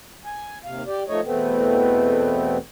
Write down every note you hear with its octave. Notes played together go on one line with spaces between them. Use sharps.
G#5
D#2 C3 F5
G4 D5
F3 A3 D#4 C#5 D#5
E2 B2 A3 B3 C4